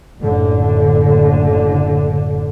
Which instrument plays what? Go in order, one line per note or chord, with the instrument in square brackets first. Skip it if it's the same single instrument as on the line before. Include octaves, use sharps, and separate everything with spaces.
[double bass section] F#1 A2 D3